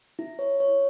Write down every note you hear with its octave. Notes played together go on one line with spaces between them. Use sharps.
E4
C#5
C#5